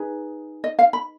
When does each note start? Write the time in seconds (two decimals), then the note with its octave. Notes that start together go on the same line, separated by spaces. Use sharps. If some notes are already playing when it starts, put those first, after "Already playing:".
Already playing: D#4 G#4 B4
0.64 D#5
0.79 F5
0.93 B5